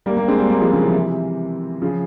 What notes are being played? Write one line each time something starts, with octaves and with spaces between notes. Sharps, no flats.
G3 A#3
G3 A#3
G#3 C4
G3 A#3
G3 A#3
F3 G#3
C#3 F3
C3 E3
C#3 F3